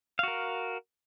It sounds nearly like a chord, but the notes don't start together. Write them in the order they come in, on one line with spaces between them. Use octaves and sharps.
F5 F#4 A#4